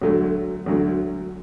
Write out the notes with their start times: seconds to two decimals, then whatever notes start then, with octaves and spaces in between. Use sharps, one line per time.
0.02 D2 D3 F#3 A3
0.66 D2 D3 F#3 A3